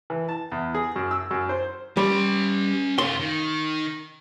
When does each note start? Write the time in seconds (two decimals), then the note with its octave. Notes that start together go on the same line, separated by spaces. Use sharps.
0.10 E3
0.29 A5
0.52 E2
0.75 G#4
0.96 F#2
1.11 E6
1.31 F#2
1.49 C5
1.97 G3 C#4 C6
2.98 A3 F4 C6
3.20 D#3